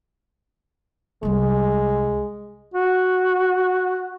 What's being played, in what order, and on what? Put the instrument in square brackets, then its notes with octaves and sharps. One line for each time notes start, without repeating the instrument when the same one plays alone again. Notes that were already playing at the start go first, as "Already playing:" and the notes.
[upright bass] C2 G3 [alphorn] G#3
[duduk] F#4